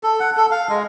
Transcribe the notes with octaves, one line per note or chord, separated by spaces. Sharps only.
A4
F#5
A4
F5
G#3